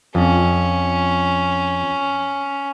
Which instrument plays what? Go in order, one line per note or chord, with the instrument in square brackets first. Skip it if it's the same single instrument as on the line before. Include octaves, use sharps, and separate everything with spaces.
[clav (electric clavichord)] F2 [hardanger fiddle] C#4